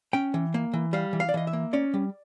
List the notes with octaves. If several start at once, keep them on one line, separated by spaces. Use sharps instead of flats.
C#4 G5
E3
A#3
E3
G3 F5
E3
F5
D5
E3 D#5
E5
A#3
C#4 D5
G3